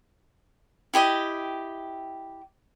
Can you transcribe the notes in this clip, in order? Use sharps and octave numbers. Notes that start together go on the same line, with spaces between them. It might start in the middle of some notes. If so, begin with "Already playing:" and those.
E4 G4 D#5 G5